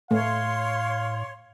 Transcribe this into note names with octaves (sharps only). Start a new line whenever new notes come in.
A2 A3 C#5 F5 C6